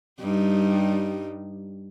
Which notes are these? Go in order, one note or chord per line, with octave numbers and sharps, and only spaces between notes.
G2 G3 D#4